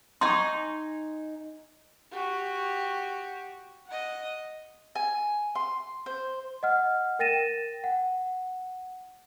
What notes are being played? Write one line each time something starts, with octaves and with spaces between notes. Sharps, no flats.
D#4 G#5 C6 C#6
F#4 G4
D#5 F#5
G#5
C6
C5
D#5 F#5 F6
A#4 G5 A6 A#6 D#7 E7
F#5